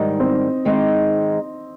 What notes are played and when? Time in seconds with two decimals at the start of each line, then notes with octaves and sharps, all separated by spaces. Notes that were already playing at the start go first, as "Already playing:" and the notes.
Already playing: G#2 D#3 G3 D#4
0.20 C4
0.65 D#3 G#3 C4 D#4